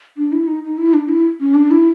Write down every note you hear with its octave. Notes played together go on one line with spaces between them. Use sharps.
D4
E4
D#4
D#4
E4
D4
E4
C#4
D4
E4